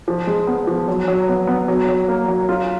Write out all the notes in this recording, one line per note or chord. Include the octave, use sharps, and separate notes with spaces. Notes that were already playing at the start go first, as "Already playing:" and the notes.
F3
G#3
B3
F3
F#3
F#3
B3
B3
F#3
F#3
A#3
F#3
F4